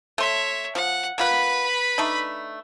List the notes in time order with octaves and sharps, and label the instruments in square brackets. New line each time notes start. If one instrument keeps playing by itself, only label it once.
[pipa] A3 C6 [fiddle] C#5 E5
[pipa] F3 [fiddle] F#5
[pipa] A#3 F4 F#5 [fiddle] B4 B5
[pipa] A3 D4 D#4